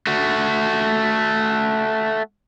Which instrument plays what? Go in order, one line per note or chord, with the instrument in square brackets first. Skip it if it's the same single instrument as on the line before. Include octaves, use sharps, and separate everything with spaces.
[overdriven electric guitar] A3 F#4